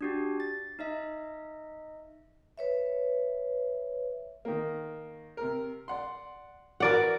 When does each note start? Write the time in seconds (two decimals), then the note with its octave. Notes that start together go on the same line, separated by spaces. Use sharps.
0.01 D4 F#4 G4
0.40 A6
0.79 D#4 D#5 E5
2.58 B4 C#5 E5
4.45 D#3 A#3
5.37 C3 A#4
5.88 D5 F#5 C6
6.80 E3 F#4 A#4 B4 D5 F#5